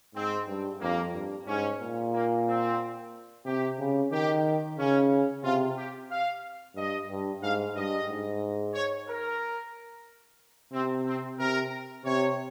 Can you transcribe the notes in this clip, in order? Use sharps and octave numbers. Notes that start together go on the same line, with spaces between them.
G#2 C4
G2
F2 A#3
G2
G#2 C#4
A#2
A#3
C4
C3 G4
C#3
D#3 G4
C#3 C#4
C3 F4
G4
F5
G2 D#5
G2
G#2 F5
G2 D#5
G#2
C#5
A#4
C3 C4
C4
C3 A#4
C3 C#5